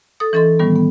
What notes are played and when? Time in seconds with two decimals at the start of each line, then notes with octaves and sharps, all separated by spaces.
0.20 A4 D#6
0.33 E3 C#4 A4 D#5 C6
0.59 A2 D#3 G3 B3
0.76 B3